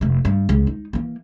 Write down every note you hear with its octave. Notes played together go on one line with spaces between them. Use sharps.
F1 A3
G2
C#2
D#4
E3 A#3